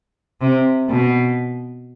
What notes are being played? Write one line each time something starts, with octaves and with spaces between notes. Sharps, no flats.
C3
B2